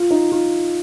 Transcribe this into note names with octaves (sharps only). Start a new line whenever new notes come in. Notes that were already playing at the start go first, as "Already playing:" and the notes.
Already playing: F4
D#4
F4